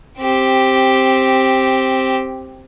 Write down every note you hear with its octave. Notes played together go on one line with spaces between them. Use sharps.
C4 G4